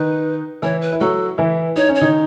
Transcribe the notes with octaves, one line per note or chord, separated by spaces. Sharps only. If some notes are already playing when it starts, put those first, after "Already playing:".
Already playing: D#3 D#4 B4
E3 E4 C#5
B4
E4
F#3 F#4 A4
E3 E4
D#4 C#5
C#4
C#5
D#3 D#4